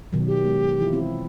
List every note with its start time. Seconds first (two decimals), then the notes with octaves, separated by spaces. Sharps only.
0.13 B2 D#3 F#3
0.27 G4
0.44 G#3 B3
0.80 E3 E4 F4
0.93 C4 E4